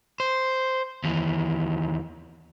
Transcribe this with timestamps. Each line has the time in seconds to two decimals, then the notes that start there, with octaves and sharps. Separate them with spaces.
0.20 C5
1.04 D#2 E3